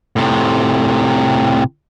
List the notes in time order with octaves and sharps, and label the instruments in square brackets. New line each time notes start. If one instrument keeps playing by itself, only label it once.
[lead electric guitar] A2 C3